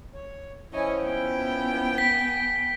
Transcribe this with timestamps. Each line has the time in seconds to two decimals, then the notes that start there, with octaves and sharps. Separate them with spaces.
0.14 C#5
0.73 F3 C#4 E4 C#5 D#5 G#5
1.03 B3 G5
1.98 G#5 B6